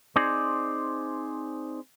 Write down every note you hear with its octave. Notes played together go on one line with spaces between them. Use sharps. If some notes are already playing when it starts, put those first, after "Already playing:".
C4 D#4 G#4 C5 D5